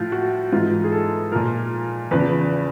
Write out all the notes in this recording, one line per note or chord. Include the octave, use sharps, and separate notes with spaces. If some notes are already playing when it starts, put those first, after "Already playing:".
Already playing: A2 F3 F4
F#4
G#2 E3 F4
G#4
A4
A#2 F3 A#4
E2 C#3 F3 B4